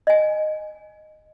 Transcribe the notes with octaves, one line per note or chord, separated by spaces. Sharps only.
D#5 G#5